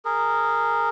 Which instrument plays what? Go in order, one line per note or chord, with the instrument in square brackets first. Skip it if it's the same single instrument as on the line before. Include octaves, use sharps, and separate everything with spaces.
[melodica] G#4 A#4